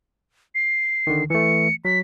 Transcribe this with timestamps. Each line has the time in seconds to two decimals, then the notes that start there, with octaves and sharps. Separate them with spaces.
0.55 C7
1.07 D3 D#3
1.30 E3 A3 C#7
1.85 F#3 B6